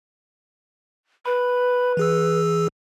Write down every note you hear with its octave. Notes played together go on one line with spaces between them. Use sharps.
B4 B5
E3 G#4 E6